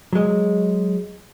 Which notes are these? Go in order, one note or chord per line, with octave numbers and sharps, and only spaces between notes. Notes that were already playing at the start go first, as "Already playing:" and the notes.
F#3 G#3